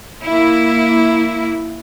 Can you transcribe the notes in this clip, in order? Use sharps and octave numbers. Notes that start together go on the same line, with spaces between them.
A#3 E4